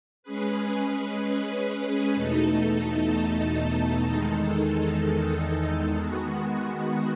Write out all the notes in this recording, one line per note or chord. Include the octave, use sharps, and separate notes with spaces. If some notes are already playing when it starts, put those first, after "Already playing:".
G#3 C#4 G#4 B4
E2 B2 A3 D#4 A4
E2 D#3 G#3 D#4 A4
D#3 G#3 B3 F#4